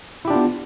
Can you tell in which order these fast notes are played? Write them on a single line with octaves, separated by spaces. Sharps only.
E4 G4 D4 F4 B3